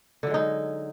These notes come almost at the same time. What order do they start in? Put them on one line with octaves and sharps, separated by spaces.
D3 F#3 G#3 D#4